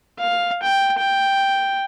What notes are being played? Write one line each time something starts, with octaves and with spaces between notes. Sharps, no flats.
F5
G5
G5